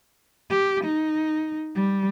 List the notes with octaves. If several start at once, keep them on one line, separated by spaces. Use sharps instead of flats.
G4
D#4
G3